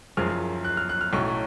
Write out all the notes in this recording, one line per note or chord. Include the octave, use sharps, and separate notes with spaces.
F#1 F#2 F3 G#3 F6
F#6
F6
F#6
F6
B1 A2 F#3 A3 C#4 C#6